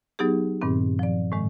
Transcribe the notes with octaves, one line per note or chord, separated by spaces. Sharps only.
F#3 B3 D#4 G4 G#4
G2 A#2 D#3 C4
F3 D5
A2 D#3 G#3